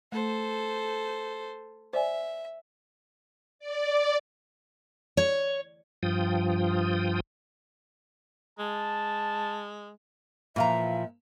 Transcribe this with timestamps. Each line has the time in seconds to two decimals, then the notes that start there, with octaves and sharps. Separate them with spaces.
0.12 A3 A4 C5
1.93 C5 D5 E5 G#5
3.59 D5
5.17 C#5
6.03 G2 F3 F4 G5 D#6
8.59 G#3 A5
10.56 A#2 E3 F3 E5 F5 A#5